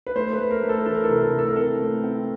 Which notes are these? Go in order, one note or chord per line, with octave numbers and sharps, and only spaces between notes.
B4
A3 C5
B4
A3
A#4
A3
A4
A#4
E3 A4
A#4
A4
C3 A#4
A4
A3 A#4
A4
A#4
C4 A4
A3
C4